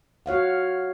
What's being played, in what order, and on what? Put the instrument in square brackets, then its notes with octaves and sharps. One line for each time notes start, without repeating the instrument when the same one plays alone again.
[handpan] F#4 C#5 F5 F#5